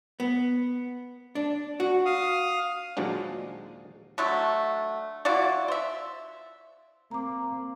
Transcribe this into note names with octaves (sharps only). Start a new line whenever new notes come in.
B3
D4
F#4
F5 D#6
D#2 A#2 F3 F#3 G#3 D4
D3 F#3 A3
E3 F4 F#4 D5
C5 E5
A#3 C4 A#5 D6